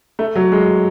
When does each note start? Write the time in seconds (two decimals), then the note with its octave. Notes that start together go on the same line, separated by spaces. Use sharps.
0.19 A3
0.35 F#3
0.52 G#3